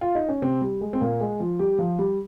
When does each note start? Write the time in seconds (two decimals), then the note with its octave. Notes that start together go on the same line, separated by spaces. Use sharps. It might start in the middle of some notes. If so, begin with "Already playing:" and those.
0.01 F4
0.15 D#4
0.29 C#4
0.42 C3 C4
0.61 G3
0.81 G#3
0.93 C4
1.01 A#2 A#3
1.21 G#3
1.40 F3 F4
1.59 G3 G4
1.79 F3 F4
1.99 G3 G4